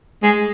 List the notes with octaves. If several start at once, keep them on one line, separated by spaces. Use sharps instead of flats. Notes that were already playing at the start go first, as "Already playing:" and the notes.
G#3